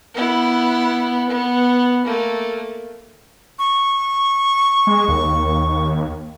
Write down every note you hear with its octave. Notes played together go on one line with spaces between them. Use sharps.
B3 E4
B3
A3 A#3
C#6
G#3
D#2